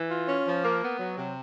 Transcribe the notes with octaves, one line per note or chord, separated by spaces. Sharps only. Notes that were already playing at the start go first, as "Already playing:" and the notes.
Already playing: E3
F4
C#4
F3
A#3
B3
F#3
C3